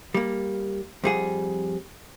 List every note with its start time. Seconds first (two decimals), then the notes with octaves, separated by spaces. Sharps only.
0.14 G3 A#3
1.04 F2 G3 G#4 F#5